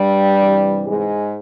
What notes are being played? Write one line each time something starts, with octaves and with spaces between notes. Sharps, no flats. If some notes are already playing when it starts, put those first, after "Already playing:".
Already playing: G2 G3
C3 E3
G#2 G#3